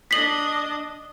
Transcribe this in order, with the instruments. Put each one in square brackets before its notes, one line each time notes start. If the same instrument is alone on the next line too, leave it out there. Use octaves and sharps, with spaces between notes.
[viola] D4 D#5 [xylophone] B6 C7 F#7